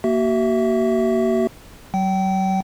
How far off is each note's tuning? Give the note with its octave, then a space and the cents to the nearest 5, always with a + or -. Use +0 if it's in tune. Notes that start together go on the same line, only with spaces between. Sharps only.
A#3 +0 F#4 +40 E5 +0
F#3 +35 G5 -30